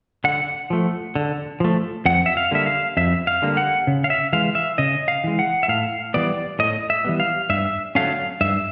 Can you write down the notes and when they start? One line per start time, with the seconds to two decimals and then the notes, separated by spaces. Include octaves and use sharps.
0.24 D3 F#5
0.70 F3 A3
1.15 D3
1.60 F3 A3
2.05 F2 F#5
2.26 E5
2.37 F5
2.51 D3 G3 A#3 E5
2.66 F5
2.97 F2 E5
3.27 F5
3.42 D3 G3 A#3
3.57 F#5
3.87 C#3
4.04 F5
4.10 E5
4.33 E3 G#3 F5
4.55 E5
4.78 C#3 D#5
5.08 F5
5.24 E3 G#3
5.39 F#5
5.63 E5
5.68 A2 F5
6.14 E3 G3 B3 D5
6.59 A2 D#5
6.90 E5
7.05 E3 G3 B3
7.20 F5
7.50 G2 E5
7.95 D3 F#3 A3 C#4 F5
8.41 G2 E5